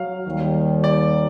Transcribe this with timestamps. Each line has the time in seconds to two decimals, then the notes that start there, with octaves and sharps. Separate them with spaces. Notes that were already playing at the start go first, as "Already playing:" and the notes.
Already playing: F#3 F5
0.26 D#2 D#3 G3
0.84 D5